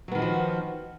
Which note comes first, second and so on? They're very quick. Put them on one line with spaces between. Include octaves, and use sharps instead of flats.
F#3 B3 D#3 F#4 F3